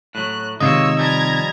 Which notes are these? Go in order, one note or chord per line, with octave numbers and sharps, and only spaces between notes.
A2 F#3 F#6
C3 D#3 G#3 A#3 F4 C#5 D#5 E6
F3 G3 A#5 G#6